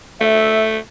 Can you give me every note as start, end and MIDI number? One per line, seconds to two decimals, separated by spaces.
0.21 0.78 57
0.21 0.66 76